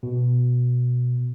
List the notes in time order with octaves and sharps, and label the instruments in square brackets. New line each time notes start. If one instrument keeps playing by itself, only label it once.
[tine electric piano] B2